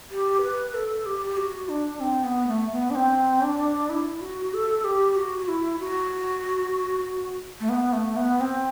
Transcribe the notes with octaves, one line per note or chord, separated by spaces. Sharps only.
G4
B4
A4
G4
F#4
D4
C4
B3
A3
B3
D4
C4
D4
E4
F#4
A4
G4
F#4
F#4
E4
F#4
A3
B3
A3
B3
C4